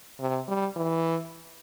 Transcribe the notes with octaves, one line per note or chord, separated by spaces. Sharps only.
C3
G3
E3